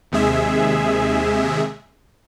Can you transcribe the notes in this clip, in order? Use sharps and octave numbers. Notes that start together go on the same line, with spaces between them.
D#2 C3 G#3 G#4 E5